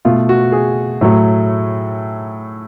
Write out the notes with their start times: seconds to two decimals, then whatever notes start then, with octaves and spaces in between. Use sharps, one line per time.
0.05 B2 A3 F4
0.29 F#4
0.52 G#4
1.01 A2 F#3 A3